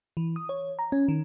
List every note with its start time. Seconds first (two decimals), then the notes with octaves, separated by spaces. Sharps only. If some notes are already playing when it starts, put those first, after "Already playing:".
0.17 E3
0.36 D#6
0.49 C#5
0.79 A#5
0.92 C#4
1.08 D#3